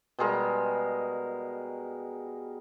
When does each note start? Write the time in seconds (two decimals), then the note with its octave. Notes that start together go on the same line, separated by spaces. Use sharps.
0.19 B2 G3 G#3 A#4